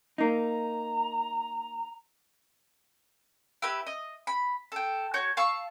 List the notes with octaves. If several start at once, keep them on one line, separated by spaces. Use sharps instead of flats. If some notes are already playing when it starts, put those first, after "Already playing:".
A#3 D#4 A#5
E4 G4 B4 E5
D#5
B5
A4 G5
F#4 C#5 G6
F5 A5 C#6 E6